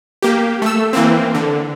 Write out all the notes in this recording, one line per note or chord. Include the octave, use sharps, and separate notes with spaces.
A#3 G4
A3 E6
E3 A#3 C4
D3